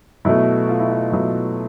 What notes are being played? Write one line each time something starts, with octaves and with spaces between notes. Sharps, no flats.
B2 F#3 A3 E4
F4
E4
F4
B2 F#3 A3 E4